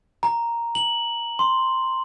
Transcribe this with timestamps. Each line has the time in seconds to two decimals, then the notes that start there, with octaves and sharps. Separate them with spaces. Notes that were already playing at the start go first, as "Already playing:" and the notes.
0.23 A#5
0.75 F#7
1.39 C6